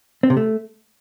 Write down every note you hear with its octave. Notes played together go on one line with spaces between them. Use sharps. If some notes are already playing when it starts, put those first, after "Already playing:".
C4
C3
A3